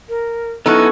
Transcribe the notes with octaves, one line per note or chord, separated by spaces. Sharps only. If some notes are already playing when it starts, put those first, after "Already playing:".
A#4
F#3 B3 C#4 D#4 E4 A4 C#6